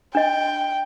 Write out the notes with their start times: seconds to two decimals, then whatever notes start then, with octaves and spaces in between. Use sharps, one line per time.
0.15 D4 D#5 G5